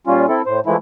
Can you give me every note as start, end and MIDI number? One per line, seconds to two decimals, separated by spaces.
0.07 0.26 46
0.07 0.26 55
0.07 0.26 61
0.07 0.26 65
0.28 0.42 60
0.28 0.42 64
0.28 0.42 69
0.46 0.60 45
0.46 0.60 72
0.66 0.76 52
0.66 0.76 53
0.66 0.76 56
0.66 0.76 57
0.66 0.76 64